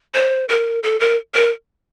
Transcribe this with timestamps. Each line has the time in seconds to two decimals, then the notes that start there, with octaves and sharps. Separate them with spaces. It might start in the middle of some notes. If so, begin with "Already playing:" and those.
0.15 C5
0.49 A#4
0.83 A4
1.00 A#4
1.34 A#4